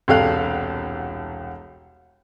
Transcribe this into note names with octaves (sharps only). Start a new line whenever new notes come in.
E1 C2 G4 A4 F5 F#6